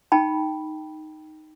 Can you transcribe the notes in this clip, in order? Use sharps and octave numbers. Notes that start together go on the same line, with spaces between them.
D#4 G5 A5 B5